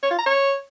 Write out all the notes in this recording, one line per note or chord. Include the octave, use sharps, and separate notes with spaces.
C#5
F4
A#5
C#5